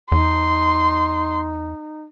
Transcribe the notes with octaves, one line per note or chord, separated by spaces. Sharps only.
E2 D#4 C6